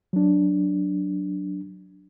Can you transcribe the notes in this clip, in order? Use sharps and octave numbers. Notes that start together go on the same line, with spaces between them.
F#3 D4